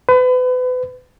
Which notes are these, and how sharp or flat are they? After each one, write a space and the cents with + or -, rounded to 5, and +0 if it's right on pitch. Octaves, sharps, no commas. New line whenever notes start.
B4 +35